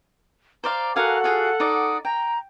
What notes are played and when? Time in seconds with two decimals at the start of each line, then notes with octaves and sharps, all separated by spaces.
0.64 C5 D5 F5 A#5
0.96 F#4 A4 A#4 F5 F#5 G#5
1.24 F4 G#4 F5
1.60 D#4 D5 D#6
2.05 G5 A#5